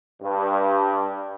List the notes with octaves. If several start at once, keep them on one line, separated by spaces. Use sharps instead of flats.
G2